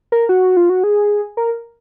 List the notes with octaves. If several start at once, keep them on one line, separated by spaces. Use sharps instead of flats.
A#4
F#4
F4
F#4
G#4
A#4